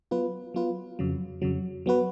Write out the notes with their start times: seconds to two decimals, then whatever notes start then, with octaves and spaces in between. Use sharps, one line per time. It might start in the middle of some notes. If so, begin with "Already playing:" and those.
0.11 F#3 B3 F4 B4
0.54 F#3 B3 F4 B4
0.99 F2 C#3 F#3
1.42 F2 C#3 F#3
1.86 F#3 B3 F#4 B4